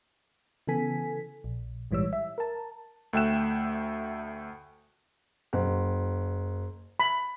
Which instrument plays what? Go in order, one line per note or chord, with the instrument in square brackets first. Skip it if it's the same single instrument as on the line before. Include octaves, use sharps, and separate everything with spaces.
[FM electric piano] C#3 E3 B3 A4 G#5 B6
A#1
A#1 G#2 E3 G3 C#5 E6
E5
A#4 A5
[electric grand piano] D2 A3 E5 G5 F#6 E7
[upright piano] F#1
[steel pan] B5